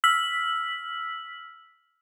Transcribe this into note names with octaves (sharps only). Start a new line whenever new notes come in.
E6 F6 B6 F#7